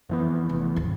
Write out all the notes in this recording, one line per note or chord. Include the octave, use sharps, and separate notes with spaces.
F2 E3 B3
F1
G#1 D#2